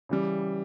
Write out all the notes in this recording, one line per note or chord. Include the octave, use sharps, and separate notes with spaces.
C#3 E3 G3